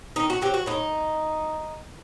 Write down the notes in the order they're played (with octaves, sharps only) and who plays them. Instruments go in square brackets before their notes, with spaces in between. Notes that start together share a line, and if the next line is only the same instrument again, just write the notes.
[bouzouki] D#3 D#4
F#4
F#3 C4 G4
F#4
A2 D#4